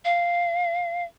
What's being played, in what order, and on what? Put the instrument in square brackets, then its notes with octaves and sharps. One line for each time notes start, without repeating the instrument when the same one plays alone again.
[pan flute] F5